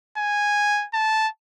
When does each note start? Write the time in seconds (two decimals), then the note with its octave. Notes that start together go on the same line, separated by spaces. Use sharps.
0.18 G#5
0.94 A5